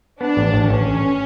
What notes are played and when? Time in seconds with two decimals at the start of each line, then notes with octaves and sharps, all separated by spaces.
0.20 B3 D4
0.37 A1
0.54 A1
0.70 A1 C#4
0.87 A1